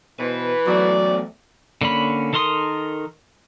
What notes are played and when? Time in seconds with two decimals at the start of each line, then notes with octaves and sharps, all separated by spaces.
0.20 B2 E3 B4 C5
0.67 E2 F#3 A3 D5
1.81 D3 A#3 C#4 B5
2.33 D#3 A4 A#4 C6 D#6